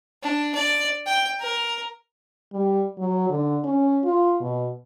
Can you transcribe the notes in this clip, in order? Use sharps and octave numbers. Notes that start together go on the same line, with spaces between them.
D4
D5
G5
A#4
G3
F#3
D3
C#4
F4
B2